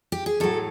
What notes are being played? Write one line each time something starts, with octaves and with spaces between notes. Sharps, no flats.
G4
G#4
A2 F#3 A4